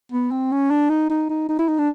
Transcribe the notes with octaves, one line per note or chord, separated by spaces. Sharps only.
B3
C4
C#4
D4
D#4
D#4
D#4
D#4
E4
D#4
D4